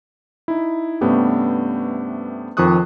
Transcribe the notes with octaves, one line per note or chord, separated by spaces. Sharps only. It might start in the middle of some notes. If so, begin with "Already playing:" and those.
D#4 E4
G2 C3 A3 B3 C#4 G4
F2 D#3 F3 C#6 D#6 F#6